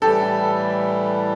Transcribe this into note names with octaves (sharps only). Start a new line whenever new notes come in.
A2 E3 G3 G4 A4